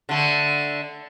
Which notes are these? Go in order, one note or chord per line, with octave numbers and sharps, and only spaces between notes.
D3 A3